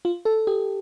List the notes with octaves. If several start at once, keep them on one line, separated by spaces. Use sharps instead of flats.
F4
A4
G4